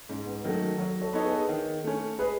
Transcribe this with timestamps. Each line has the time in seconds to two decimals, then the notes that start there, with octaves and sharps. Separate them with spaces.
0.09 G#2 C#4
0.26 B3
0.44 D#3 F#3 A3 C#4
0.78 F#3 A4 C#5
1.01 A4 C#5
1.13 B3 D#4 A4 C#5
1.25 G#4 B4
1.49 D#3
1.84 A3 C#4
2.19 G#3 G#4 B4